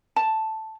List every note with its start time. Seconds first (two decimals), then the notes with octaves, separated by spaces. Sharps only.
0.16 A5